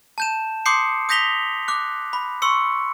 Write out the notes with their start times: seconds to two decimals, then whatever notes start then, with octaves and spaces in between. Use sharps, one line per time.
0.18 A5 G6 E7
0.66 C6 D6 D#6 G6 C7 C#7
1.09 D#6 G6 A#6 B6 F7 G7
1.68 D6 F#6
2.13 B5
2.42 C6 C#6 E6 C#7